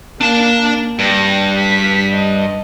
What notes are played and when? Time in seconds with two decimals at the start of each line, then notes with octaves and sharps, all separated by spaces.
0.21 A#3 D4 A5
0.99 G2 G5 A#6
1.56 B6
2.12 D#5